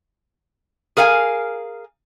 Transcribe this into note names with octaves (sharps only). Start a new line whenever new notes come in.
G#4 A#4 F5 F#5 G#5